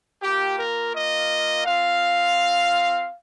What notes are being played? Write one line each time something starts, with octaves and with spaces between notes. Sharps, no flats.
A#3 F4 G4
A#4
D#5
C4 F4 F5